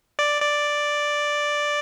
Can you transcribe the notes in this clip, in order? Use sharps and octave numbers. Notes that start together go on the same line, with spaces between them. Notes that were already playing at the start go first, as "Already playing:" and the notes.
D5
D5